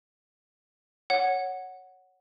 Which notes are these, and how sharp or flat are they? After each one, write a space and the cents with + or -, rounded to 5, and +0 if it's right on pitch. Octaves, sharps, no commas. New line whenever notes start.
C#5 +0 F#5 +0